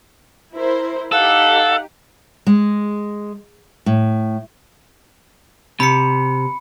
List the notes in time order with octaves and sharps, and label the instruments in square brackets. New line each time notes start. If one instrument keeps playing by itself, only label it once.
[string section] E4 A#4 C5
[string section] D#4 G4 [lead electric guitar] A4 [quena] F5 [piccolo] F#5
[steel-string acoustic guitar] G#3
A2
[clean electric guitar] C3 [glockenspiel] B5 C#7